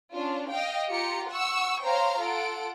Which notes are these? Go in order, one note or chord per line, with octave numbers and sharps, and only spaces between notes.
C#4 D4 F4
D#5 F5 G5
F4 G4 A#5 C#7
F#5 C#6 E6
C5 C#5 F5 G5 A#5 C6
F4 A4 F#5 D7